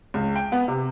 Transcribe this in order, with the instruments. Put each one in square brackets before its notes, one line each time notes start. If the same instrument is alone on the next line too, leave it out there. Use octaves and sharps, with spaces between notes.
[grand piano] C#2
G5
B3
C3